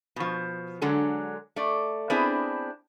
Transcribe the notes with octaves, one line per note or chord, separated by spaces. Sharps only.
B2 F3
D3 F#3 G#3 A4
A3 D5
B3 C4 D4 E4 G#4